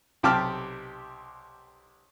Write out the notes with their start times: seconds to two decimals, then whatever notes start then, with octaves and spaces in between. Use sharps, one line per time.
0.23 B1 C3 G4 A5 D6 F6